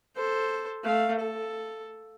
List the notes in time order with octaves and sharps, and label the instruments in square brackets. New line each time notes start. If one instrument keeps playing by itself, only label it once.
[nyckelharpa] A4 C5
A3 F5
A4